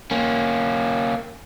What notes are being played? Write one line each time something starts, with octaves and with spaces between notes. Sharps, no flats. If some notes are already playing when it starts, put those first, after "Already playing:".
A#3 C#4